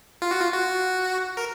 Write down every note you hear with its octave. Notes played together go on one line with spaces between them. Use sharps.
F4
F#4
F4
F#4
A#4